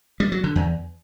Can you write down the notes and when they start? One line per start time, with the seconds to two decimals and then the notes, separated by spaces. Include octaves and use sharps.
0.20 G3
0.32 F#3
0.44 D3
0.55 E2